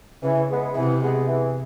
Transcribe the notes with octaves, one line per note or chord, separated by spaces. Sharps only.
C#3 E3
G#3 B3
C3 E3
G#3 B3
E3